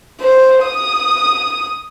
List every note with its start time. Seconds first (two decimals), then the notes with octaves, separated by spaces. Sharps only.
0.21 C5
0.65 D#6